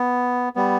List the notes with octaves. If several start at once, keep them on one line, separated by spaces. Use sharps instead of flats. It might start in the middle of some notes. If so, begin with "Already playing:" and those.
Already playing: B3
G3 B3